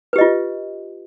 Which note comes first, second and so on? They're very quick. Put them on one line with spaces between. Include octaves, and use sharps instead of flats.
B4 G4 D#5 F4